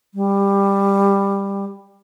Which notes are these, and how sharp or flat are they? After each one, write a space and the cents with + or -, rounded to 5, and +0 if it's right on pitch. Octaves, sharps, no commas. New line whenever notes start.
G3 +15